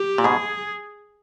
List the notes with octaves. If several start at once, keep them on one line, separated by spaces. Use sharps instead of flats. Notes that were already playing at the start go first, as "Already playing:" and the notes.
Already playing: G4
A#2
G#2 B2 G#4